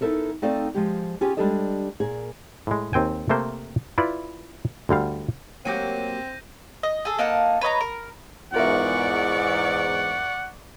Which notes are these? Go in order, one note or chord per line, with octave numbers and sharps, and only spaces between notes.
B3 D#4 E4 A4 A#4
A3 C4 D#4 A4 D5 F5
F3 G#3 G4
C#4 F4 G4 G#4 G#5
G3 G#3 D4 G4 A4 D#5
A#2 G#4 A#4
A2 G#3
D#2 C4 G5 G#5
C3 A3 A#3 C5
E4 F4 B4 D5
D2 D3 G3 F5
F#3 A#3 C4 F#4 G4 G6 A#6 D#7
D#5
G#4 A4
A#3 D#4 F#5 A5
B4 C#5 D#5 A#5
A#4
E2 G#2 F4 A#4 D5 E5 F#5 C#6